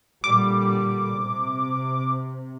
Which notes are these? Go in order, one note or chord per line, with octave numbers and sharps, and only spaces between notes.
A#2 D3 G3 D6
C3